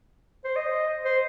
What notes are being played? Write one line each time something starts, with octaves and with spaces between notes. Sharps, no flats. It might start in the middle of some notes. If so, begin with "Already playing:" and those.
C5
D#5
C5